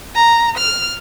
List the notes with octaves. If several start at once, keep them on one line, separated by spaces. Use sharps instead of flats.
A#5
F6